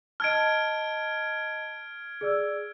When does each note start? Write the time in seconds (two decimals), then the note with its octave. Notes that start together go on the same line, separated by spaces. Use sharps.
0.20 D#5 A5 F6 G#6 D7
2.21 G#4 D5 E6